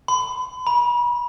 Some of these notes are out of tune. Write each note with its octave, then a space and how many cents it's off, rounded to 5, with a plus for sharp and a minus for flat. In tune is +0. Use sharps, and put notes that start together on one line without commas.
B5 +40
B5 -35